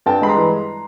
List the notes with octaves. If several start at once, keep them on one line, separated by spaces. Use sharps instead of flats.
G2 G5 A5
G#3 B5
A#5 C6
E3